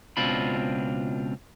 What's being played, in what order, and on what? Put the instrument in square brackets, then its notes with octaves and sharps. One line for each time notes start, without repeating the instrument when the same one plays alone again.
[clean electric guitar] C#2 B2 C4 D4 F4 B5